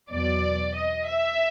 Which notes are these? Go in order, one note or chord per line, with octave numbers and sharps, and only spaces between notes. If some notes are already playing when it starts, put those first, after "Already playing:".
E2 B2 F#3 D5
D#5
E5